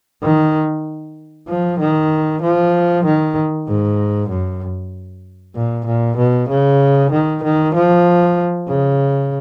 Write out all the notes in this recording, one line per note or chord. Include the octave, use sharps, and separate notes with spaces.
D#3
F3
D#3
F3
D#3
G#2
F#2
A#2
A#2
B2
C#3
D#3
D#3
F3
C#3